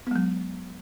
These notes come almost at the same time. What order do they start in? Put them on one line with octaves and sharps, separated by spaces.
B3 G#3 F#3